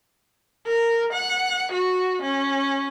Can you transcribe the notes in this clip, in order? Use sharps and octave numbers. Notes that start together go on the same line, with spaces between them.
A#4
F#5
F#4
C#4